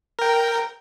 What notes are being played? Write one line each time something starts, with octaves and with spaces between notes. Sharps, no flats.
A#4 G5